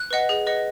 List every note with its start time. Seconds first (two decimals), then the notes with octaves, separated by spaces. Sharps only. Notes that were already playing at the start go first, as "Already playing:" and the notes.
Already playing: F#6
0.11 B4 D#5 F#5
0.29 G#4
0.46 B4 D#5 F#5